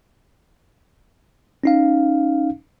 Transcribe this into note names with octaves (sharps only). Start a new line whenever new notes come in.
C#4 D#4 F5